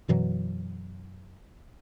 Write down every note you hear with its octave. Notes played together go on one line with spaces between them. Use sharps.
F#2 B2 E3 F#3